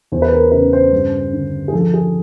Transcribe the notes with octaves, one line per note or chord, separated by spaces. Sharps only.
E2 C5
B4
A#4
C#3 B4
C5
G2
D3
G#4
F3 A4
G#4